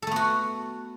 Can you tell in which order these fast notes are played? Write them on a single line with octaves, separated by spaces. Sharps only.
A4 A3 B3 F#4